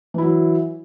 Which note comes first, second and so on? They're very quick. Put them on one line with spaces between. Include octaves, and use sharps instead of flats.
E3 E4 F#3